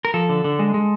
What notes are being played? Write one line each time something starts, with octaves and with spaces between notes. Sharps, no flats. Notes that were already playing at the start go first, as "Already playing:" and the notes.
A#4
F3 A4
D3
D3
G#3
G#3